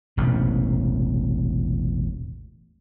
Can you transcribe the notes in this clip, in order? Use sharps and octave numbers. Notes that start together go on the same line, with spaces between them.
E1 A1 C3